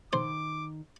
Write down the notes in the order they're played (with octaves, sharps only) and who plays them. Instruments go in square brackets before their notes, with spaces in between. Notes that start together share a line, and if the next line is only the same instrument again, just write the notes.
[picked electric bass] D#3 [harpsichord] C5 [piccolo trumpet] D6